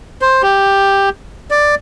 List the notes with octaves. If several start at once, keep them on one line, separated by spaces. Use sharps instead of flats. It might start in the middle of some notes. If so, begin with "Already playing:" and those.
C5
G4
D5